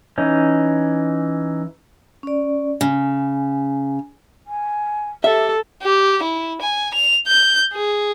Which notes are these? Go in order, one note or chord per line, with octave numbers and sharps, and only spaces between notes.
E3 C#4 D#4
C#4 D5
C#3 G#5
G#5
G4 A4 E5
G4
E4
G#5
F7
G6
G#4